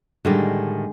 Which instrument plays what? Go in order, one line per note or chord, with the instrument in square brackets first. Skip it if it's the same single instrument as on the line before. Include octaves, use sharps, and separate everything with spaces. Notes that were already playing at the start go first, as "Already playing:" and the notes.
[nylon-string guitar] A2 D#3 G3 [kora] D3 G#3 G4